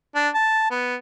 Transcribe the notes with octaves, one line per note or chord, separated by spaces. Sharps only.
D4
A5
B3